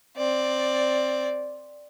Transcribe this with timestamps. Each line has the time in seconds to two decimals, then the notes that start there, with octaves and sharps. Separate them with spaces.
0.17 C4 D5